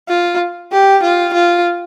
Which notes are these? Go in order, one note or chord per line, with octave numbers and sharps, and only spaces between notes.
F4
G4
F4
F4